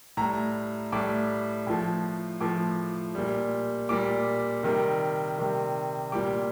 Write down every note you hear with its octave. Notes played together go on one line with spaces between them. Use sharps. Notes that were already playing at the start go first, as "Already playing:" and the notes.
A2 G3 A#5
A2 G3 D6
A2 F3
A2 F3 D6
A#2 G3
A#2 G3 D6
C3 D#3 G3
C3 D#3 G3
A#2 G3 D6